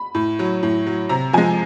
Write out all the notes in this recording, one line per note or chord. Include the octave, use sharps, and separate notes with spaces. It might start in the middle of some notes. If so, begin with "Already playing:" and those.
Already playing: B5
A2
F#3
A2
F#3
C3 A#5
F3 G#3 G#5